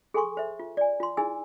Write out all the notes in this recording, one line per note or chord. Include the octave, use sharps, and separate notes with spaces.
G#4 A4 G#5 C6 C#6
C5 E5
F4
D5 G#5
F4 C6
D#4 E4 G#4 G#5 E6